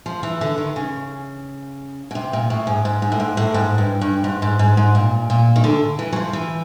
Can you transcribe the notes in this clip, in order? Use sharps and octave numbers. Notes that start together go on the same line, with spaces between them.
F3
E3
D3
D#3
C#3
B2
C3
A#2
A2
G#2
G#2
G#2
A2
G#2
A2
G#2
G2
G2
G#2
G#2
G#2
G#2
A#2
A#2
D#3
D3
E3
F#3
F3
E3